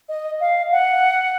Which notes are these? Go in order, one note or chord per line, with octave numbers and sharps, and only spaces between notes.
D#5
F5
F#5